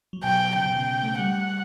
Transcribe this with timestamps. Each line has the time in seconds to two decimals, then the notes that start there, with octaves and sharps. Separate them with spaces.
0.13 F#3
0.24 B2 G5
0.55 C#3 G5
0.66 B2
0.76 C#3
1.03 A3
1.19 G3 F#5